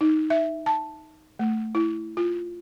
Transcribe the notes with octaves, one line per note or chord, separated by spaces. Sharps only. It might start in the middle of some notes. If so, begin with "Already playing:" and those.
D#4
E5
A5
A3
E4
F4